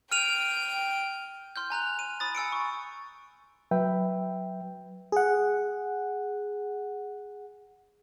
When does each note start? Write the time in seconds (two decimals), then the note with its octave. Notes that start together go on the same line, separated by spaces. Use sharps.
0.12 G5 F6 D7 D#7 F7
1.56 C6 F6 G6
1.70 G#5 A#5 F#6 F7
1.99 D#7
2.20 B5 D#6 A6
2.35 G#5 E6 C#7 D7
2.52 C#6
3.71 F#3 B4 E5 G5
5.12 G#4 F#5